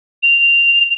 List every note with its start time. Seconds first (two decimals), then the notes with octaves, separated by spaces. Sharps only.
0.23 F7